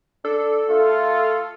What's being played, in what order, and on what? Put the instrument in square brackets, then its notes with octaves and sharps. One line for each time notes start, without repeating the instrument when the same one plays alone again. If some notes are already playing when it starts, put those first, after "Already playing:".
[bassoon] D4 [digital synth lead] A4
[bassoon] A3 [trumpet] F4